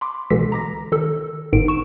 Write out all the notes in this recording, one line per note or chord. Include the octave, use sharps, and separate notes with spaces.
B5 C6 D6
C#2 B2 D3 E3 E6 B6
A#5 D6 A#6
D#3 A4 E6
G1 G#2 D#3 D7
C#6 E7